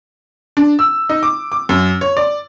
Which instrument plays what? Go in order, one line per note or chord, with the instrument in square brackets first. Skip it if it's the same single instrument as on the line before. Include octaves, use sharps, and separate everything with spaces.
[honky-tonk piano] D4
E6
D#4
D6
D6
F#2
C#5
D5